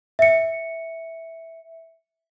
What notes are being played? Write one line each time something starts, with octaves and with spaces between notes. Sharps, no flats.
E5 C#7